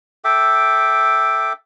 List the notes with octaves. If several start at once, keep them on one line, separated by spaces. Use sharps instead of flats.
A4 E5 G5 D6